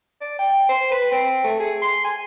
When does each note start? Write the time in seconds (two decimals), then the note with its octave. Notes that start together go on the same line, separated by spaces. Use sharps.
0.21 D5
0.39 G5
0.69 C5
0.92 B4
1.12 C4
1.44 A3
1.60 G#4
1.82 C6
2.04 G#5